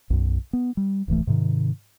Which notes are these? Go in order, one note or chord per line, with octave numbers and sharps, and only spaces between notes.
B1 F#2
B3
G3
D1 A1 E3 A3
G#2 C3 D#3